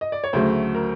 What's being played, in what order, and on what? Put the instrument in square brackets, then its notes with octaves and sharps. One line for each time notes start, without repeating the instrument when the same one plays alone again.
[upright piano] D#5
D5
C#5
D2 C#3 F#3 A3 C5
A#4